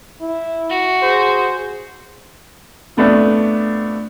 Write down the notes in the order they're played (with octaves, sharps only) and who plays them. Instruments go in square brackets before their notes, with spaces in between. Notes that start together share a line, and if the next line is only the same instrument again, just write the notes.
[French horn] E4
[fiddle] F#4
[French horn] G#4 [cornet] C5
[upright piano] F2 A3 B3 D4